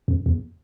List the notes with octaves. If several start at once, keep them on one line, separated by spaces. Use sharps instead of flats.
F2
E2